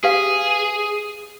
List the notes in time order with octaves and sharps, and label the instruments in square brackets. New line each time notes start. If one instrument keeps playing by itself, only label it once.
[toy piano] G4 B4 F5 [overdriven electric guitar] G#4